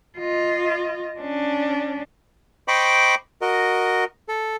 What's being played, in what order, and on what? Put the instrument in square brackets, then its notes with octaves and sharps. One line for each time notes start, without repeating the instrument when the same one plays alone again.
[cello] F4 D#5
C#4 D4
[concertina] C5 D#5 G5 B5 C#6 D6
F#4 A#4 D#5
A4